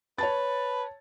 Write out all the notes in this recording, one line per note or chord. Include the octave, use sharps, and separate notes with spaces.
B4 C#5 A5 A6